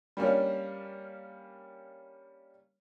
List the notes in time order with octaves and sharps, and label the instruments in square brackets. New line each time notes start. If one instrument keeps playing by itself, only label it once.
[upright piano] G3 A#3 C#4 D4